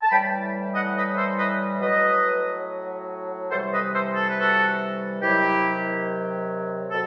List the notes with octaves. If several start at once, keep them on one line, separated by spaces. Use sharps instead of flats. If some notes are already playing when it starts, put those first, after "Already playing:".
A5
A2 E3 G3 G5 B5
D#5 F#5
B4 D#5
A4 C5
B4 D#5
A2 F#3 B4 D#5
C3 E3 G3 A4 C5
B4 D#5
A4 C5
A4
B4
F#4 A4
C3 D#3 F#3 E4 G4
B2 A4